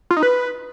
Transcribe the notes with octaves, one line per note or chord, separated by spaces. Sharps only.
F4
D#4
B4